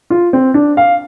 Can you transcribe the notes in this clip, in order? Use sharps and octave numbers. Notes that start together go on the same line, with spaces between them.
F4
C4
D4
F5